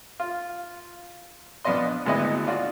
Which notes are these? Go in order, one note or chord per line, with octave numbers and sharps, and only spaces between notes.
F4
A#1 F3 B3 D4 D#5 C6
G#1 D2 G#3 B3 E4 D#5
D4 F4 F#4 D5